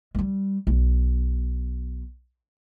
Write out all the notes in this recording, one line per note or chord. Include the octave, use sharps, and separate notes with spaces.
G3 G#3
B1